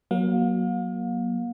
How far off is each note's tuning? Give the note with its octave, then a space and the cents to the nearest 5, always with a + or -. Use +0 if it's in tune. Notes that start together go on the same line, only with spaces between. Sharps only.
F#3 +0 A#3 +30 F5 +40